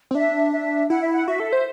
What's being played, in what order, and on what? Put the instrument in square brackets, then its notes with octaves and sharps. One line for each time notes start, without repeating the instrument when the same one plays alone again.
[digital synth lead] C4
[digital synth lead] D4 [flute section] E5
[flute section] E5
[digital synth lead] E4 [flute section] F#5
[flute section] E5
F#5
[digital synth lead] F#4 [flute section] E5
[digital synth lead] A4
C5